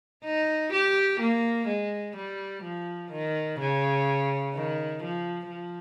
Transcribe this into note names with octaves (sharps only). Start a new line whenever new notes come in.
D#4
G4
A#3
G#3
G3
F3
D#3
C#3
D#3
F3
F3